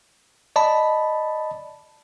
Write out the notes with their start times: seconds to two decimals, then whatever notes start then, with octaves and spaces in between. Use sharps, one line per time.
0.56 D5 D#5 A5 B5